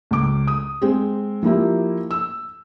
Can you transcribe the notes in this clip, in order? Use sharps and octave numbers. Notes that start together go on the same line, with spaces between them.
C#2 D6
D#6
G#3 C4
F3 A#3 E4 G4
E6